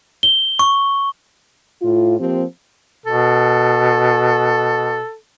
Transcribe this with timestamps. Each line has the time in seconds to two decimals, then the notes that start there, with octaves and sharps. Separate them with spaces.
0.23 G7
0.59 C#6
1.82 A2 F4
2.20 F3 A#3 C4 G4 C5
3.06 B2 A4